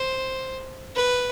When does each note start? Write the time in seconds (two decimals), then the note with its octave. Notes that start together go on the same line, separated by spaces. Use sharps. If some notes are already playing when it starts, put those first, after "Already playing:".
Already playing: C5
0.96 B4